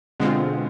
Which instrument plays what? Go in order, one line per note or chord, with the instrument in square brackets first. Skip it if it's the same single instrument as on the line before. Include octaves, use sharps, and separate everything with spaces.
[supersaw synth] B2 G#3 C4 F4 [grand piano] D3